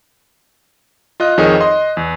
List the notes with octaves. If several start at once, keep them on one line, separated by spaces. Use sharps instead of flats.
F4 D#5 F#6
F2 D#3 G#4 C#5 D#5
D#5 C6
E2